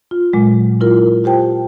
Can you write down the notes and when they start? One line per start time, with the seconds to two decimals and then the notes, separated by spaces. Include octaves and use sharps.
0.11 F4
0.33 A#2 F#3 G#3
0.81 E4 F4 A#4
1.24 F4 G4 C5 G5 A5